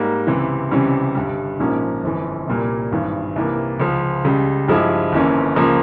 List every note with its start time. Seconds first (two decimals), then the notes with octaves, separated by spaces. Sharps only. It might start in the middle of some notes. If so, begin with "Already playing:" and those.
Already playing: G#2 G3 A#3
0.27 C#2 C3 E3
0.71 C#2 C3 E3 G3 C#4
1.15 G1 G2 G3
1.59 A#1 G#2 F3 A#3 C#4
2.03 G1 F2 E3
2.48 C2 A#2 G3 A#3
2.92 G#1 G2 E3
3.36 C2 C3 E3 A#3
3.80 C#2 C#3 F3
4.24 C#2 C#3 G3
4.68 G2 F3 G#3 E4 G4
5.12 G1 F2 E3 A#3 C#4
5.56 C#2 C#3 F3 A#3